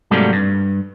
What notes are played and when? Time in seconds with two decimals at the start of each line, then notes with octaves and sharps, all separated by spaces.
0.11 G#2 C3 F#3 G3 A3 A#3
0.33 G2